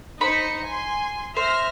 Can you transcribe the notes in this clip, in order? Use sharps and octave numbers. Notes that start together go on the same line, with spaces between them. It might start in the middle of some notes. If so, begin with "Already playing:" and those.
D#4 C5 B5 C#7
G#5 C6
C5 E5 F6 A#6